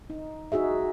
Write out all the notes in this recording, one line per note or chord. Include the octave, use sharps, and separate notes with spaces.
D#4
D#4 F#4 G#4 E5